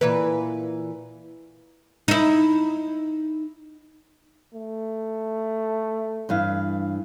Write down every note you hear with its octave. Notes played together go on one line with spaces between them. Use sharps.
A#2 E3 B4
D#4 E4
A3
G2 E3 F5